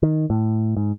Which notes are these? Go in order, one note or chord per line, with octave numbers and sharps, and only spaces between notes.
D#3
A2
G#2